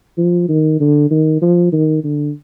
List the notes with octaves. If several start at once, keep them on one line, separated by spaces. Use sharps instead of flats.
F3
D#3
D3
D#3
F3
D#3
D3